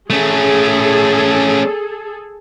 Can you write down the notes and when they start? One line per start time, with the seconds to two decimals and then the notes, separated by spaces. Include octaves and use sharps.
0.10 A3 C#4 G#4 A4